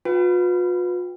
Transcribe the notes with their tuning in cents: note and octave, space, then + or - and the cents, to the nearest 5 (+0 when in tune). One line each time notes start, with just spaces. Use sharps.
F4 +45 B4 +0 G5 +0